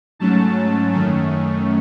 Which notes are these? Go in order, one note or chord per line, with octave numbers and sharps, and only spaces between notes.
G#2 F#3 A3 C#4 A5
F#2 D#3 A3 C#4